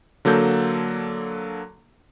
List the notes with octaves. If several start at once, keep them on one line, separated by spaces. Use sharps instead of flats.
D3 F#3 A#3 A4 G6